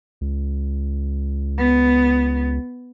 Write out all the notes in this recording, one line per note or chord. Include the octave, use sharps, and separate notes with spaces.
C#2
B3